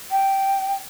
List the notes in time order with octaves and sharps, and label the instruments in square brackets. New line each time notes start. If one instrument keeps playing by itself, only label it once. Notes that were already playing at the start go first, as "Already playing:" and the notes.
[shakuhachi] G5